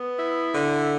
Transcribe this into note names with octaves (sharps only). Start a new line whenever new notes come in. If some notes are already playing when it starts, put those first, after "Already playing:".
Already playing: B3
E4
D3